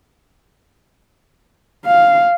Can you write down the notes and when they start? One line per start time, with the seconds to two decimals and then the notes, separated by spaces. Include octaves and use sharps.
1.86 F5